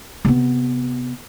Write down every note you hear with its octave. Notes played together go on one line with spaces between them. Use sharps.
C3 B3